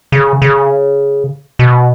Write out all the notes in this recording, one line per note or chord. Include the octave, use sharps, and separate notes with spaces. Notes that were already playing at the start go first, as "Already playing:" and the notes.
C#3
C#3
B2